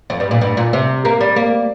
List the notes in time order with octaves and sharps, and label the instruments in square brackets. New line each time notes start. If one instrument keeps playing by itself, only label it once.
[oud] F2
G2
A#2
G2
A#2
C3
A#3
G3
A#3